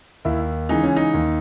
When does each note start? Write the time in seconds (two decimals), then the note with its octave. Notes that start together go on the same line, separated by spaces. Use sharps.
0.25 D#2 E4
0.69 C#3 E3 G#3 D#4
0.83 C#4
0.96 D#4
1.14 D#2